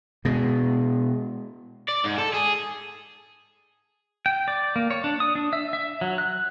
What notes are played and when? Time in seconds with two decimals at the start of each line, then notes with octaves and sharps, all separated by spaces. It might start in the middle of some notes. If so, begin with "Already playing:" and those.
0.25 B2 G#3
1.88 D5
2.04 G#2
2.18 A4
2.33 G#4
4.26 G5
4.48 D5
4.76 A#3
4.91 C#5
5.04 D4
5.20 D#6
5.35 D4
5.53 E5
5.73 E5
6.01 F#3
6.18 F#6